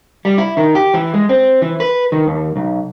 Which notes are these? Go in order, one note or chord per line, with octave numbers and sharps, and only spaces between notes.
G3
E4
D#3
G4
E3
G#3
C4
E3
B4
D#3
D#2
B1